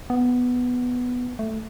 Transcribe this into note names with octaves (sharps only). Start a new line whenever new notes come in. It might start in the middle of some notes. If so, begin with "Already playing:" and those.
B3
A3